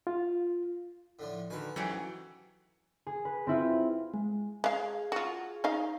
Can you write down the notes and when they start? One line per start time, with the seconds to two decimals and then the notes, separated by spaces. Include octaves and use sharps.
0.07 F4
1.19 A2 D3 F3
1.50 D3 D#3 F#4 B4 G#5
1.76 E2 G#2 E3 F#3 A3 C#4 G4 G#4
3.07 G#4
3.25 B4
3.47 C4 E4 F4
4.14 G#3
4.64 G#3 G#4 F5
5.12 F4 F#4
5.64 D#4 D#5 F5